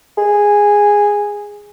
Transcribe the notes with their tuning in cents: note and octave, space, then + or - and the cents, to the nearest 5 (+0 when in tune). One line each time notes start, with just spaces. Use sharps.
G#4 -10